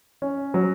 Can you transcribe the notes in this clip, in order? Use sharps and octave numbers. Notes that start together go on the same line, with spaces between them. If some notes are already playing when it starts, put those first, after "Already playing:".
C#4
F#3